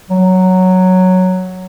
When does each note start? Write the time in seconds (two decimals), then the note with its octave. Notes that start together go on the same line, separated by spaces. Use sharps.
0.10 F#3